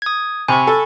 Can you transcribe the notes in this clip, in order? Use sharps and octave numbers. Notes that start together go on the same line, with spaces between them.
D#6 G#6
C3 G#5 B5 C#6
A4